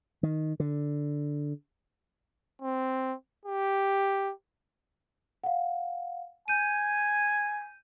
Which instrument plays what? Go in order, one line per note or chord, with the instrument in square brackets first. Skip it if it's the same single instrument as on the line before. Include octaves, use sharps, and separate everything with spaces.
[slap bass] D#3
D3
[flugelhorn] C4
G4
[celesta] F5 F#5
[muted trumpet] G#5 [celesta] G6 D#7